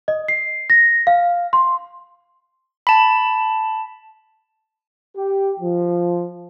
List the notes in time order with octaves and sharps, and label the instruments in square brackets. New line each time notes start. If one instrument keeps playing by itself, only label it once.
[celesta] D#5
C7
A#6
F5
C6
[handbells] A5 B5
[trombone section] G4
F3